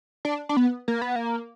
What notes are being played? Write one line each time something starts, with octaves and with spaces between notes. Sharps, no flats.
D4
D4
B3
A#3
B3
A#3